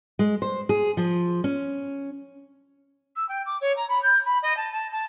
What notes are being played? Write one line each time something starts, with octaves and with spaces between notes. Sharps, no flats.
G#3
C5
G#4
F3
C#4
E6
G5
D6
C#5
A#5
B5
G6
B5
D#5
A5
A5
A5